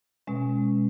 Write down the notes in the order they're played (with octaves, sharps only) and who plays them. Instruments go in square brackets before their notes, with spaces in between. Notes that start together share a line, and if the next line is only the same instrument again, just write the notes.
[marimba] B2 G#3 C#4